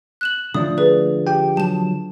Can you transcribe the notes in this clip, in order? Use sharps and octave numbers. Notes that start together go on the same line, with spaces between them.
F#6 E7 F#7
D3 F3 A3 D5 D#6
G#4 B4 D5
G4 G5
F#3 A5 E7